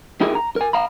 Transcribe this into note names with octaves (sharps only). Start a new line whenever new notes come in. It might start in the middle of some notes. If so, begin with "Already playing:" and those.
D#4 E4 G4 G#4 A#4
A#5
A#4 G#5
F5 A#5 B5